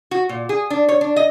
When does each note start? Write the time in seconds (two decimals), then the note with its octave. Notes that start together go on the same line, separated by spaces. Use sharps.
0.11 F#4
0.29 A#2
0.49 G#4
0.70 D4
0.89 C#5
1.01 D4
1.16 D#5